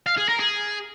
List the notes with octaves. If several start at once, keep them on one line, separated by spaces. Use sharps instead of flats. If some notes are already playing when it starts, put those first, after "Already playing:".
F5
G#4
A#4
G#4